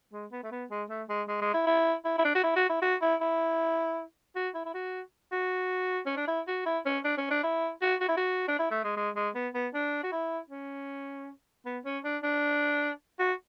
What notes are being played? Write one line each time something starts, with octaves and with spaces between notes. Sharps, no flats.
G#3
B3
A3
B3
G#3
A3
G#3
G#3
G#3
E4
E4
E4
E4
D4
F#4
E4
F#4
E4
F#4
E4
E4
F#4
E4
E4
F#4
F#4
C#4
D4
E4
F#4
E4
C#4
D4
C#4
D4
E4
F#4
F#4
E4
F#4
D4
E4
A3
G#3
G#3
G#3
B3
B3
D4
F#4
E4
C#4
B3
C#4
D4
D4
F#4